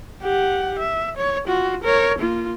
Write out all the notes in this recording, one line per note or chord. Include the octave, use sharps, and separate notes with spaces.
G4 F#5
E5
C#5
F4 F#4
A#4 C#5
A#3 F4